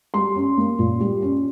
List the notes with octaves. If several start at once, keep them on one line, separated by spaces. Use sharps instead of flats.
G3 C6
C#4
A#3
A#2
G3
C#4